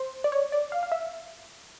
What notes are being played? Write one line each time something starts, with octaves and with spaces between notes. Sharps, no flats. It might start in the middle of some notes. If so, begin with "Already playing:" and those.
Already playing: C5
D5
C#5
D5
F5
F5
E5